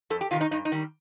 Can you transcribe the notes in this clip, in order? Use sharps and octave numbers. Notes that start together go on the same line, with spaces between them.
F2 A4
G4
C3 D#3 F4
D#4
G2 D#4
D#4
D#3 G3